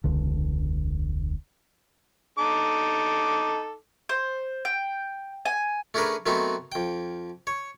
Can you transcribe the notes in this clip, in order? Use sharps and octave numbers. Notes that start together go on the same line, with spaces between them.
E1 C#2 D3
D#4 A4 D6
C5
G5
G#5
A3 C#4 D4 G#4 A#4 B4
D#3 F#3 A3 B3 C4 D#4
F2 G5
C#5